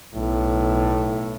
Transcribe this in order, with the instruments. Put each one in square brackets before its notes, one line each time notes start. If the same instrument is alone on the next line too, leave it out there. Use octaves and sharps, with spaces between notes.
[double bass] B1 [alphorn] A2